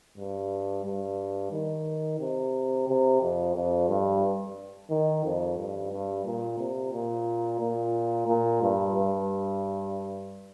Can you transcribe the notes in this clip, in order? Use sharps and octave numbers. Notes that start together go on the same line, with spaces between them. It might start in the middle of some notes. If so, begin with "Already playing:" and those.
G2
G2
D#3
C3
C3
F2
F2
G2
D#3
F2
G2
G2
A#2
C3
A#2
A#2
A#2
G2
G2